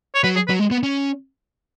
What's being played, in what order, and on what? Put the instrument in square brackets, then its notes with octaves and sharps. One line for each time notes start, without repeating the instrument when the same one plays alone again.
[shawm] C#5
[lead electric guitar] F#3 [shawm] B4
[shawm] G#4
[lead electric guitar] F#3 [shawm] B4
[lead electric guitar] G#3
B3
C#4